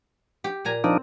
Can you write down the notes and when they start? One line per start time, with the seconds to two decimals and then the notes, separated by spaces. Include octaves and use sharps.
0.44 G4
0.65 A#2 G#5 A#5
0.84 F3 C4 D4 D#4